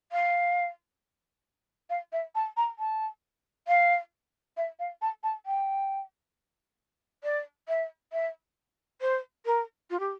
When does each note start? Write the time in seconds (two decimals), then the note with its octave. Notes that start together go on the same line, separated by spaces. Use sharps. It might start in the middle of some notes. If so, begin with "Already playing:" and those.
0.12 F5
1.90 F5
2.12 E5
2.35 A5
2.57 A#5
2.79 A5
3.68 F5
4.57 E5
4.79 F5
5.02 A5
5.23 A5
5.46 G5
7.24 D5
7.68 E5
8.13 E5
9.01 C5
9.46 A#4
9.90 F4
10.00 G4